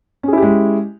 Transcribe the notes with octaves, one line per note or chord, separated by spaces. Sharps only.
G#3 C#4 E4 G4 G#4